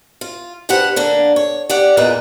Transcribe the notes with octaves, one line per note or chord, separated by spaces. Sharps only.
F4
G2 G4 B4 C5 F#5
D3 A#3 D4
C#5
G4 D5 F#5
E2 A#2 F4 B4 D#5 A#5